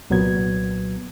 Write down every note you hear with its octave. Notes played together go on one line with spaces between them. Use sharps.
C2 A#2 F#3 B3 G#6